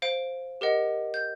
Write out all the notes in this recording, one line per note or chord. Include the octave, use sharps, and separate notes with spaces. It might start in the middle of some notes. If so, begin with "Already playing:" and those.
C5 F5 D7
G4 A#4 D#5 F#5
G6